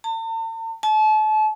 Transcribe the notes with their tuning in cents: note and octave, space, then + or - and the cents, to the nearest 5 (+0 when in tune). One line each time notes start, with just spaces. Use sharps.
A5 +45
A5 -35